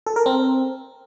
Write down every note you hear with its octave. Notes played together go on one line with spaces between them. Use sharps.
A4
A#4
C4